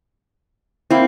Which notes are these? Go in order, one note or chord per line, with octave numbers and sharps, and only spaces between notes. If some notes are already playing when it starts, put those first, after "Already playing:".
A#3 C4 E4